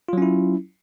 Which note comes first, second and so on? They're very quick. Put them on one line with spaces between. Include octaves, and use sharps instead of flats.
F4 F#3 C#4 E4